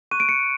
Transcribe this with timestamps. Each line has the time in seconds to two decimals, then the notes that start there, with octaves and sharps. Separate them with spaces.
0.11 C#6 F#6 D#7
0.20 D7
0.29 C#7